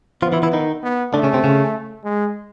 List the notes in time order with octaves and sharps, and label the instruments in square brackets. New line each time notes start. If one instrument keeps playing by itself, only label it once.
[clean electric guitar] F3 F4 [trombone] B3
[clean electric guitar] E3 E4
E3 E4
D#3 D#4
[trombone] B3
[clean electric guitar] D3 D4 [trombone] A3
[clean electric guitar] C#3 C#4
C3 C4
C#3 C#4
[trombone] G#3